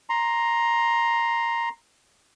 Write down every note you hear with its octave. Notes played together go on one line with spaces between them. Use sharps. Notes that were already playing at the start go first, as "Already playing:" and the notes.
A#5 C6